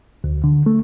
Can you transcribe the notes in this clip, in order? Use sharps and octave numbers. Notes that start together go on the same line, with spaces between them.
D2
D3
A3